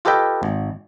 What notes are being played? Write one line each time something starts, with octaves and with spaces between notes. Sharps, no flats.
F4 G4 A4 B4 D#5 G5
G#1